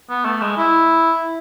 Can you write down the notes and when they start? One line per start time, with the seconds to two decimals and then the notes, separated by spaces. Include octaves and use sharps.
0.10 B3
0.25 A3
0.42 G#3
0.57 E4